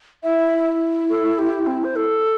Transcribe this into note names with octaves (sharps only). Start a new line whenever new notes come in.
E4 E5
A4
G4
C4
C5
A4